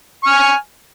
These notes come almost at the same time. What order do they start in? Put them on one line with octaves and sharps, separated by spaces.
C#6 F6 G#5